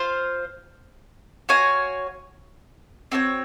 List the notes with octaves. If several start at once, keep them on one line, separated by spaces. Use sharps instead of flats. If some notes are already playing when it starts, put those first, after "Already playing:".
Already playing: F4 C5 F5
F#4 C#5 F5 G#5
C4 F#4 A#4 C#5